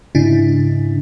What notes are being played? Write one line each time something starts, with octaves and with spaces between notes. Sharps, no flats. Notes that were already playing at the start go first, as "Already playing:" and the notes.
G#2 C#3 D4 E4